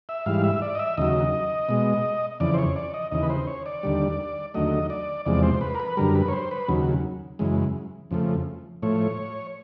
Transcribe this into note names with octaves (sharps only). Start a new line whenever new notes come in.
E5
G#2 E3 G3 F5
E5
D5
D#5
E5
D#2 C#3 F#3 D#5
B2 G#3
F2 C#3 E3 D5
C5
C#5
D5
D#5
D#2 C#3 E3 D#5
B4
C5
C#5
D5
D#2 D3 G3
D#2 D3 F#3 A3 D#5
D5
E2 C3 F3 G#3 D5
C5
B4
A#4
B4
F#2 D3 G3 A#4
B4
C#5
C5
B4
D#2 C#3 F#3
F#2 C#3 E3 G#3
F2 C#3 F3 A3
A2 F3 A3 C#5